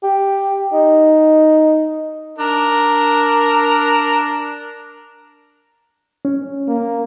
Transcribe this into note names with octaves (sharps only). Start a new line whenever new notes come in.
G4
D#4
D4 A#4 A#5
C#4
A#3